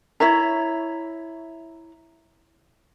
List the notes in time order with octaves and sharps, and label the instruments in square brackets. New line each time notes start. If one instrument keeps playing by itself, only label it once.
[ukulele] E4 C#5 E5 A#5